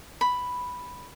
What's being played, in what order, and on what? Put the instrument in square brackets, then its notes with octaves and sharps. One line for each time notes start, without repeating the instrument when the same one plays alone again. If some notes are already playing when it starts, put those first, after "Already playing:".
[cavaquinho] B5